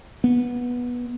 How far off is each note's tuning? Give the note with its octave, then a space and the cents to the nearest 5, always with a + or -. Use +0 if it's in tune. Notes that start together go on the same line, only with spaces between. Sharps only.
B3 -15